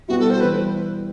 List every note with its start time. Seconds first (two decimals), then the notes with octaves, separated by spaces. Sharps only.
0.08 B2 G3 B3 E4 F#4
0.20 A4
0.30 C5
0.40 E3 G3 B3 E4 B4